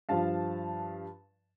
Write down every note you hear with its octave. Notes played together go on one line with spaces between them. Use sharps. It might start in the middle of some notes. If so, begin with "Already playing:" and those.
G2 F3 F5 A5